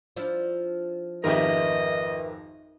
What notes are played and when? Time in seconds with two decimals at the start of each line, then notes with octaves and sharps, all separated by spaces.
0.17 F3 D4 E4
1.24 G#1 F2 G4 A#4 B4 D#5 E5